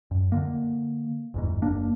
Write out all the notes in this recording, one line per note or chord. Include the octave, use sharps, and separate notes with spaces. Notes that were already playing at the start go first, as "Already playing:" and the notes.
F#2
D3 A#3
G1 E2 G#2
F#1 A#3 D4